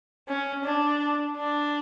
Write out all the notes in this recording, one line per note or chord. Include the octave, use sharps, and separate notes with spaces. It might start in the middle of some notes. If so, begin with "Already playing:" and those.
C#4
D4
D4